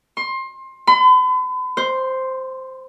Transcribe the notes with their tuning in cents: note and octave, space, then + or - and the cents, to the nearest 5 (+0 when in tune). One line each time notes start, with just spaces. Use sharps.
C6 +25
B5 +45
C5 +0